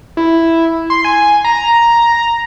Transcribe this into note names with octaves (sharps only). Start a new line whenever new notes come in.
E4
C6
G#5
A#5